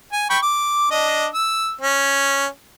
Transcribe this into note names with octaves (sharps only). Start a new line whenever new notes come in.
G#5
G5 B5 C#6
D6
D4 D#5
E6
C#4